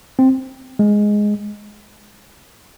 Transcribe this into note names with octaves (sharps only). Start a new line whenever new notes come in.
C4
G#3